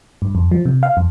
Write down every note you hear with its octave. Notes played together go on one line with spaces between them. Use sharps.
G2
F2
F3
C3
F5
F2